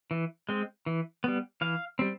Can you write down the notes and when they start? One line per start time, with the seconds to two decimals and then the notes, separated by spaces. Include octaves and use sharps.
0.11 E3
0.49 G#3 C4
0.86 E3
1.24 G3 B3
1.61 E3 F5
1.99 G3 C4